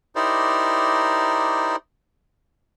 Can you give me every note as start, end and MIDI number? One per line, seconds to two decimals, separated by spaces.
0.16 1.76 63
0.16 1.76 64
0.16 1.76 67
0.16 1.76 70
0.16 1.76 72
0.16 1.76 74